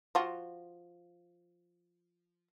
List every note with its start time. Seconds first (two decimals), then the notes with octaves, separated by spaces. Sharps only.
0.15 F3 F4 F#4